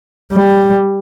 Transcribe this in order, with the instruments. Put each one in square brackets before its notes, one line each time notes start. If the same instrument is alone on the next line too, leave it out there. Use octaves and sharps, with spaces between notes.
[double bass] G3